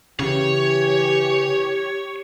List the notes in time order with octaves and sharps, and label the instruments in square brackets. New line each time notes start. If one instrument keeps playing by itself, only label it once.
[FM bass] C#3 [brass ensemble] E3 [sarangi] G4 [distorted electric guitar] C#5